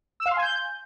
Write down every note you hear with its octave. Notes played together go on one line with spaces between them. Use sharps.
E6
F5
C6
G#5
G6